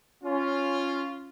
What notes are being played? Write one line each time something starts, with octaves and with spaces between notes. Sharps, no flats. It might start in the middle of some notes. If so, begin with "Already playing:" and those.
C#4 F4